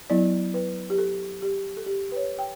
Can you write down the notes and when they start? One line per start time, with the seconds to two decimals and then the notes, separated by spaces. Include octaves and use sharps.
0.10 F#3 B3 E4 D5
0.54 B4
0.90 G4
0.98 A4
1.42 G4
1.77 A4
1.86 G4
2.12 B4
2.16 C#5
2.39 G5